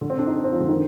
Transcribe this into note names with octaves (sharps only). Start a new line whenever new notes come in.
D3
C4
D4
D#4
D4
C4
F3
D3
D#3